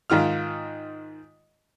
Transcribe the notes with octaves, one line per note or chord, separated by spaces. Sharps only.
G#2 D#3 F4 F6